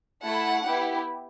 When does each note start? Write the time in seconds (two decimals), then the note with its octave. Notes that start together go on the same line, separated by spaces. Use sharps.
0.23 A3 E4 A4 F#5
0.64 B3 E4 G4